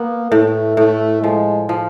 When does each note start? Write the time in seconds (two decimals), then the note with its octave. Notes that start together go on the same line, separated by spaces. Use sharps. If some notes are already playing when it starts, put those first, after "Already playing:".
Already playing: A#3 B3
0.32 A2 A3
0.77 A2 A3
1.23 F3 G#3
1.69 F3